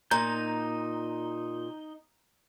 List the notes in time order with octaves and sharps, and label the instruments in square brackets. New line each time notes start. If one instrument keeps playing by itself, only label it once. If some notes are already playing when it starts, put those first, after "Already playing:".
[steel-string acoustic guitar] A#2 [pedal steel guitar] D#4 G6 [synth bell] A#5